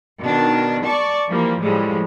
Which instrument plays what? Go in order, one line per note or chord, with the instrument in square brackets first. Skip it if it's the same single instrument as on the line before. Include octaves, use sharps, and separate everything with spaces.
[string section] B2 D#3 D4
D5 A5 C#6
E3 F3 G3 A#3
A2 F3 G3 G#3